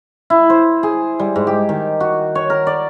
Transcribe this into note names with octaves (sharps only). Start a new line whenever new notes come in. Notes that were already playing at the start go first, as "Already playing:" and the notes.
E4
C5
G#4
G3
G#2
G4
D#3
F#4
C#5
A#4
D5